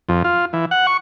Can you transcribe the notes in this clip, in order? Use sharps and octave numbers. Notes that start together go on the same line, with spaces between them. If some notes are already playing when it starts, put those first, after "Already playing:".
F2
F4
E3
F#5
C#6